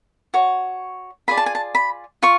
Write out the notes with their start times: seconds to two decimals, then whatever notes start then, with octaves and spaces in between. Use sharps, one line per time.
0.34 F#4 C#5
1.28 F4 G#4 D5 B5
1.37 A5
1.46 G#5
1.55 A5
1.75 B5
2.22 F4 C#6